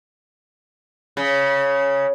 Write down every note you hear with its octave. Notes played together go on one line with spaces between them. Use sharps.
C#3